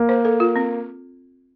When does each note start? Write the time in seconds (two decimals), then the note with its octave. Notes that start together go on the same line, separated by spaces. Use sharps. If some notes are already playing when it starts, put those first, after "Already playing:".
Already playing: A#3
0.09 C5
0.25 A4
0.40 F4
0.56 C4